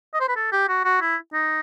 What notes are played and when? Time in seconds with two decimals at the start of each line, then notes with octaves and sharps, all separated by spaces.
0.14 D#5
0.20 C5
0.29 B4
0.36 A4
0.52 G4
0.69 F#4
0.85 F#4
1.02 E4
1.33 D#4